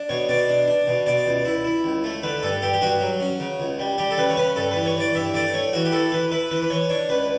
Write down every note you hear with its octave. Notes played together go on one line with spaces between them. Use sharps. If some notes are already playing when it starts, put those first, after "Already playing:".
Already playing: D4
B2 C#5
B2 D5
D4
D4
B2
B2 D5
C#2
E4
E4
C#2
A3
D3 B4
G2 A4
G2 G4
G4
G2 F#4
F#3
C#4
C#3
C#2
G3
G3 G4
A4
C#3 B4
C#5
C#4 B4
G2 A4
E3 B4
C#5
E3 D5
G2 E5
A3 D5
A3 C#5
E3 F#4
G4
E4 A4
E3 B4
E4 B4
E3 B4
B4
E3 C#5
D4 C#5
C#2 B4